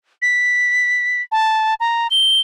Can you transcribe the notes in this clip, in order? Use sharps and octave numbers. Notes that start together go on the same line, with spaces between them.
B6
A5
A#5
G7